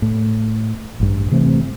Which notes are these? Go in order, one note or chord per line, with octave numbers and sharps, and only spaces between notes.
A2
A1 G2
C3 E3 A3 C4